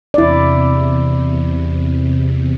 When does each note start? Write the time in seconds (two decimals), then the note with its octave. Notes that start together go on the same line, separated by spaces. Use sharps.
0.14 E2 C3 E4 D5